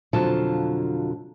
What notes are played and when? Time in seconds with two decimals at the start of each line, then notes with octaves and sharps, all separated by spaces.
0.13 F2 B2 D3 F#3 F4 A5